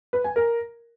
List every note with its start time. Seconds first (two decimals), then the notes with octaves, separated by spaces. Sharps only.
0.13 B4
0.24 G#5
0.36 A#4